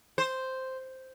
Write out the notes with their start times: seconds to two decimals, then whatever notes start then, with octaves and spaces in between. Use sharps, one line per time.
0.18 C5